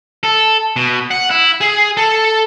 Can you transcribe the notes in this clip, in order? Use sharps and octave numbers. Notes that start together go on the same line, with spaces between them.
A4
B2
F#5
E4
G#4
A4